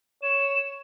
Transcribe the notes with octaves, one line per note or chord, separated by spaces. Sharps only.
C#5 E7